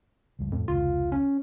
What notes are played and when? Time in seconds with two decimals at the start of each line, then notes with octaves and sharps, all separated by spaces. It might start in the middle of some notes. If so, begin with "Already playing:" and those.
0.39 C#2 G2
0.52 F2 A2
0.68 F1 C#2 F4
1.12 C#4